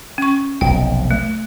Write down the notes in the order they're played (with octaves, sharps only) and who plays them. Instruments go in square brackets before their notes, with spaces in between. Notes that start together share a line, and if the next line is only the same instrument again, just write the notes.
[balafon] C#4 C#6
[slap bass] F1 B1 [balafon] G5
[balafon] A3